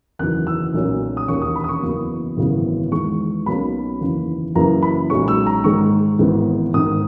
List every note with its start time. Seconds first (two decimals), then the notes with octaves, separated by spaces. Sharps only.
0.19 F#1 E2 D#3 F#3 F#6
0.47 E6
0.74 B1 A#2 A#3 C#4
1.17 D#6
1.28 E1 D#2 D#3 A#3 C#4 C#6
1.42 D#6
1.56 B5
1.64 D#6
1.69 C#6
1.83 F#1 E2 B2 A#3
2.37 G#1 F#2 C#3 E3 B3
2.92 E2 D#3 G#3 C#6
3.46 B1 B2 A#3 C#4 B5
4.01 F#1 E2 D#3 A#3
4.55 F#1 F#2 E3 A#3 A#5
4.82 B5
5.10 B1 A#2 G#3 C#4 C#6
5.28 E6
5.47 A#5
5.64 G#2 D#3 G#3 C#6
6.19 G#1 G#2 E3 G#3 B3
6.73 G#1 G#2 D#3 D#6